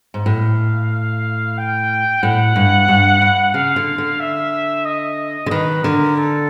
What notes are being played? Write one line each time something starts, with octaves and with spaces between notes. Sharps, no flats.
G#2
A2 F5
G5
A2 F#5
G2
G2
G2
C#3 F5
D3
D3
E5
D#5
D3
D#3 B4
D3 A#4
A4